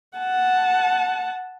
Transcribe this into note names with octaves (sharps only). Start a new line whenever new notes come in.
F#5 A5